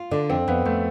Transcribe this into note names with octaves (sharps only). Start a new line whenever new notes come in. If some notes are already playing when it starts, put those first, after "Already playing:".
Already playing: F4
D3 D4
F2 C4
F2 B3
F2 A3